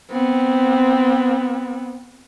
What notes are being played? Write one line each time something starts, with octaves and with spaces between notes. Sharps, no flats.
B3 C4